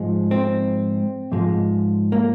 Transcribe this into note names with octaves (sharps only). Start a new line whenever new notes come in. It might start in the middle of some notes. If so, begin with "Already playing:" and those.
Already playing: G#2 F3 G#3
C4
G#2 F3 G#3
A#3